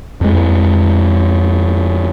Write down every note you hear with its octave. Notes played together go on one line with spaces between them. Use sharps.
F2 G#3